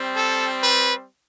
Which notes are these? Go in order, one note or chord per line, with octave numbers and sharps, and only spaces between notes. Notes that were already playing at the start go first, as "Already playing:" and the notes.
Already playing: G3 C4
A4
B4